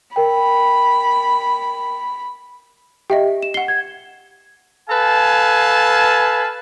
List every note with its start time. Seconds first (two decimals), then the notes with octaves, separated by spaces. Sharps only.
0.16 A#4 G5 B5
3.10 G4 D#5 E5 G5
3.43 E7
3.54 F#5 C7 G7
3.68 G#6
4.89 A4 B4 F5 G#5 A5